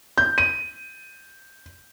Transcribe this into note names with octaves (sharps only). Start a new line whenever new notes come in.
G6
D#7